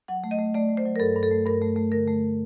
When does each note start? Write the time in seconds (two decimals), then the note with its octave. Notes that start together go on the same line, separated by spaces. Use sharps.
0.08 F#3 F#5
0.24 A3
0.31 D#5
0.38 A3
0.54 A3 D5
0.69 A3
0.77 C5
0.85 F#3
0.96 A#4
1.00 G2 A4
1.16 G2
1.23 A4
1.31 A3
1.45 G2 A#4
1.61 A3
1.76 A3
1.92 D3 A#4
2.07 A3